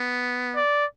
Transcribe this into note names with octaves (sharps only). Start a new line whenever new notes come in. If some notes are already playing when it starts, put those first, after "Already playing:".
Already playing: B3
D5